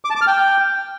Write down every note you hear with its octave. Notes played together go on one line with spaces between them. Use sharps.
D6
A5
D6
F6
G5